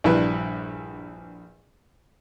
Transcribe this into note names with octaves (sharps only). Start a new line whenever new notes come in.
A#1 G2 E4 B4